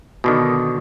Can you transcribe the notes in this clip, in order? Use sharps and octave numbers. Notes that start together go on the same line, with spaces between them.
B2 D3 D#3